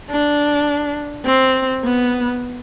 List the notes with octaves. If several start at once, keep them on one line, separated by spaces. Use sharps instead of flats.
D4
C4
B3